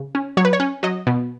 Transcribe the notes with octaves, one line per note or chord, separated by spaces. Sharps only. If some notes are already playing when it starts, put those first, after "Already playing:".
Already playing: C#3
C#4
F#3 C#5
B4
C#5
C#4
F#3 D#5
B2